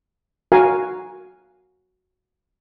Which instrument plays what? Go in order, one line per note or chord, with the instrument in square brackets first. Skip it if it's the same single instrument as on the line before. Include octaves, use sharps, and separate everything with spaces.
[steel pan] F#4 A#4 F5 G#5